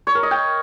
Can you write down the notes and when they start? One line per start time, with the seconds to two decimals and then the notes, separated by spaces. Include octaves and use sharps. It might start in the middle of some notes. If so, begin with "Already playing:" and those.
0.07 C#5
0.15 A#4
0.23 D#5
0.31 G5